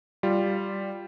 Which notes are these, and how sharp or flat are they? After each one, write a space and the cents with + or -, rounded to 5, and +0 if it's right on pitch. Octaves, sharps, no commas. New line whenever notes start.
G3 +0 F4 -5